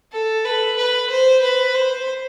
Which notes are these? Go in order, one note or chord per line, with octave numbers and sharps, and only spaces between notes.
A4
B4
B4
C5
B4
C5